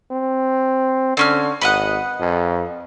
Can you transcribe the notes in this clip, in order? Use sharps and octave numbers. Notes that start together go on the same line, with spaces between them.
C4
D3 C4 C#4 F6
G#1 B4 D#5 F#5
F2